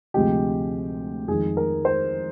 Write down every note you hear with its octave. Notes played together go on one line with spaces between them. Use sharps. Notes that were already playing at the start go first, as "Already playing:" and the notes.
D2 C3 F3 G#3 G4
F2 D#3 G#3 G#4
A#4
C5